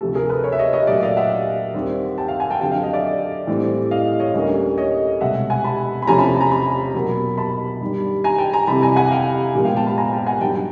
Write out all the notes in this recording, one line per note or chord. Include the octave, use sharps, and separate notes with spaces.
D2 C3 F3 A3 A4
G#4 A#4
A4 B4
B4 C#5
E5
C#5 D#5
C#5 D#5
A#2 F#3 A3 D5 E5
D#5 F5
E5 F#5
D#2 D#3 G3 C4
G5 A5
F5 G5
F#5 G#5
G5 A5
F2 D3 F#3 G5 A5
F5 G5
D#5 F5
D5 E5
A2 E3 G3 C4
D#5 F5
C#5 D#5
D2 D3 G3 A#3 C#4
C#5 D#5
C2 B2 G#3 B3 E5 F#5
F#5 G#5
A5 B5
B5
E2 C3 F3 A3 C#4 G#5 A#5
A5 B5
A5
G#5 A#5
A5 B5
B2 F#3 A#3
A5 B5
G2 D#3 G3
G#5 A#5
G5 A5
G#5 A#5
F2 C3 E3 G3 A5 B5
G#5 A#5
F#5 G#5
F5 G5
A#2 F3 G#3 B3
F5 G5
G5 A5
A5 B5
G#5 A#5
G5 A5
F#5 G#5
G2 D#3 F#3 G5 A5